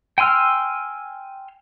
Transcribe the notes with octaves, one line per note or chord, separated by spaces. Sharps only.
G5 G#5 C6 E6 F6